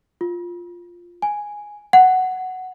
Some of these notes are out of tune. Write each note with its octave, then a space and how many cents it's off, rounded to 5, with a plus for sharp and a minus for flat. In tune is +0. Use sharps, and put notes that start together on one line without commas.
F4 +5
G#5 +0
F#5 +5